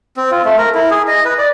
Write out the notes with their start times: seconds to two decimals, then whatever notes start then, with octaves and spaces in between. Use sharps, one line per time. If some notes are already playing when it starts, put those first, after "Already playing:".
0.17 C4
0.31 F4
0.45 A3
0.58 A#4
0.75 E4
0.91 G#4
1.08 D#5
1.25 B4
1.38 D5